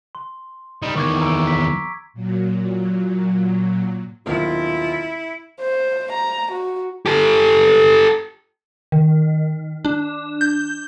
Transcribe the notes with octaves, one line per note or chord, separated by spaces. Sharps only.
C6
G3 D#4
E2 D#3 C#6 D6 G#6
A#5 E6 D7
B6
A#2 F#3
D#1 B1 D#3 E4 F4
C5
A#5
F#4
G4 A4
D#3
D4
G6